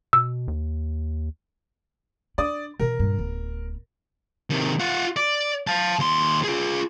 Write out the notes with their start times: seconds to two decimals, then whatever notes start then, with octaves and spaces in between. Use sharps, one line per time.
0.13 B2 E6
0.48 D#2
2.38 D4 D5 D#6
2.80 B2 E3 A#4
2.99 G2 A#2
3.18 D1 B3
4.50 C3 D#3
4.79 F4 F#5
5.17 D5
5.67 F5 A5
5.99 D#2 C6
6.44 F4 G#4